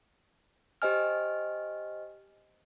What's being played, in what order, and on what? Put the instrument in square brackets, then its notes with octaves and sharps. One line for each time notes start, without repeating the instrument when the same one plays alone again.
[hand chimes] G4 C5 D#5 G#5 F6